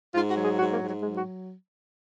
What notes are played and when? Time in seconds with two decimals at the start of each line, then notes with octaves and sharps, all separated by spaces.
0.15 G#2 F4
0.29 F#4
0.37 F#3
0.45 G#4
0.59 G#2 F#4
0.74 A#3
0.81 G#2
0.88 F#3
1.03 F#3 G#3
1.17 F#4